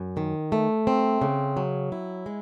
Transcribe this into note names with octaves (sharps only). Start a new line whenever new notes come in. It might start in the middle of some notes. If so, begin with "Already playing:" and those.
Already playing: F#2
D#3
A3
C4
C#3
F#3
E4
G#3